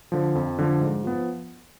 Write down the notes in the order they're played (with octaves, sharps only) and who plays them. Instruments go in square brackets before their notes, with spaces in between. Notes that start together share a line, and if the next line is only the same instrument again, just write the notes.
[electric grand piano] D3 F3
F2
D3 F3
G#2
F3 B3